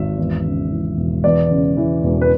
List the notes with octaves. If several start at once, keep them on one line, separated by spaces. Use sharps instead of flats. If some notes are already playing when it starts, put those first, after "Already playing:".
Already playing: G#1 E5
E2
C#3
E3
E1
E2 D5
C#3
E3
E1
B4